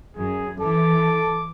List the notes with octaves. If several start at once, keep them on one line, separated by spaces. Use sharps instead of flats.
F#2 G#4
E3 A4 D6